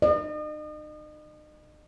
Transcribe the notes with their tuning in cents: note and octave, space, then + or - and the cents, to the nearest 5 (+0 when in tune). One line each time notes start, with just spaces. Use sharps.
D#5 -40